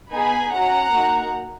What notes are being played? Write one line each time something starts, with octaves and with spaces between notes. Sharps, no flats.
B3 D#4 G#4 G#5 B5
C#4 F#4 F#5 A#5
A#3 D#4 F#4